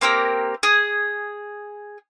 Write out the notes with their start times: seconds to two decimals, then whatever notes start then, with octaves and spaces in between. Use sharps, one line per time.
0.01 A#3 C4 G4 A#4
0.63 G#4 D#6